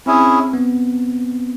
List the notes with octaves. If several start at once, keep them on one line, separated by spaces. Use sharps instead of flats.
C4 C#4 E4 G#4
B3